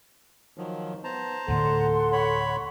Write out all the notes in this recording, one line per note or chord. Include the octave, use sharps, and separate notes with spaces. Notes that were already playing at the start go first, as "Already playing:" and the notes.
D#3 F3 F#3
B3 C5 A5 A#5
D2 A2 D3 A4 F#5 C6
C#5 B5